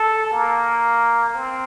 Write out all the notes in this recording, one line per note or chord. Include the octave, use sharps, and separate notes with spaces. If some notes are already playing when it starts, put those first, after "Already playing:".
Already playing: A4
A#3
C4